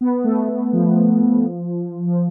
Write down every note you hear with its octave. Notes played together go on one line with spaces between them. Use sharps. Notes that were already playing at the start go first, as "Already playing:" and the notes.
B3
A3
A3
F3
F3